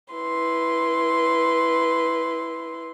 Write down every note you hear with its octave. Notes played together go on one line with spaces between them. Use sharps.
E4 B4 C6